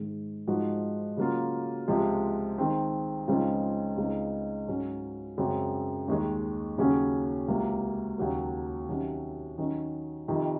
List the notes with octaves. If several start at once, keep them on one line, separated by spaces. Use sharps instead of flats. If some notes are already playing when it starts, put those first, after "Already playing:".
Already playing: G#2 D#3 G#3
G#2 F3 G#3 D#4 F#4
C#3 F#3 A#3 F4
C#2 C3 F3 G#3
D#3 G#3 C4
C#2 C#3 F3 C4 D#4
C#2 C#3 G#3 C4 D#4
G#2 F#3 C#4
F#2 C#3 G#3 C4 F#4
D#2 D#3 G#3
D#2 C#3 F#3 C#4 G#4
C#2 C3 F#3 A#3
D#2 C#3 F#3 A#3
C3 D#3 F#3 C#4
D#3 F#3 C#4
F2 C3 D#3